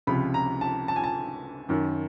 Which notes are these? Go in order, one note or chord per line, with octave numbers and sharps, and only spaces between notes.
C#2 C3 F3 B5
A#5
A5
A5
G#5
A5
F#2 D#3